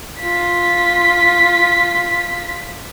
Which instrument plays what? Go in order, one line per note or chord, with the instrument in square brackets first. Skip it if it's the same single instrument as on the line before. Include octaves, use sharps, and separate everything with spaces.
[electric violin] F4 B6